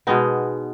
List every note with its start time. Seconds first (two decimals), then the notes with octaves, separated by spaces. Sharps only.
0.07 B2 G#3 B3 D#4